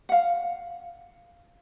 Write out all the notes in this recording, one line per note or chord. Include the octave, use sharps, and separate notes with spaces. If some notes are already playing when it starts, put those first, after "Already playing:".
F5 F#5